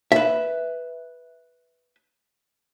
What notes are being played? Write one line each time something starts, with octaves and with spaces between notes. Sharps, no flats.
B4 E5